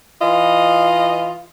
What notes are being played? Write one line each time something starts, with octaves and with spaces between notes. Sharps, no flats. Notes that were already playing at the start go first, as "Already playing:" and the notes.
E3 F4 D#5